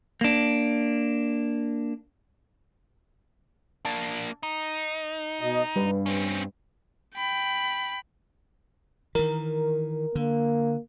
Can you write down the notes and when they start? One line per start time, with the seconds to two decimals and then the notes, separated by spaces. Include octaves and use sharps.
0.21 A#3 D4
3.85 A#3 D4 A5
4.43 D#4
5.41 B2 D#5
5.76 G2 G3 B4
6.06 C4 C#4
7.16 G5 B5
9.15 D#3 E3 A#4
10.15 D3 A#3